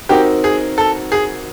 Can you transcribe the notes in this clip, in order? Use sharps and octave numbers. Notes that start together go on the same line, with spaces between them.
C4 D#4 F#4 G4 A#4
G#4
A4
G#4